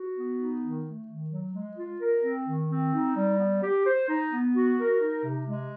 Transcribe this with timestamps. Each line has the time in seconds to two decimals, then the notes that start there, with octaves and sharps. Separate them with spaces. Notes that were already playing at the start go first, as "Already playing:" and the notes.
Already playing: F#4
0.16 B3
0.38 D#4
0.62 D#3
0.85 A3
1.08 D#3
1.31 F#3
1.54 G#3
1.77 F4
2.01 A#4
2.23 C4
2.46 D#3
2.70 C4
2.93 D#4
3.16 G3
3.39 B3
3.62 G4
3.86 C5
4.09 D#4
4.31 B3
4.55 F#4
4.78 A#4
5.01 D#4
5.24 C3
5.47 G#3